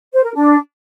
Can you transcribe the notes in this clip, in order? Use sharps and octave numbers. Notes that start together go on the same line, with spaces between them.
C5
A#4
D4